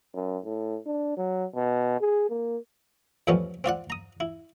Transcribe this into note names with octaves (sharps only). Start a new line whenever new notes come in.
F#2
A2
D4
F#3
B2
G#4
A#3
F2 A2 F3 G3 B3 C#4
C4 F4 D5 F#5
A#5 D#6
E4